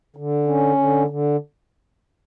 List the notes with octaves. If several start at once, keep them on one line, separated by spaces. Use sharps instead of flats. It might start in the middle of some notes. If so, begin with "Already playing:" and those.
D3
C#4
D3
D3